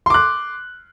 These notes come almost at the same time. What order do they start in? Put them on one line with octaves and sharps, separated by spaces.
C6 D6 F#6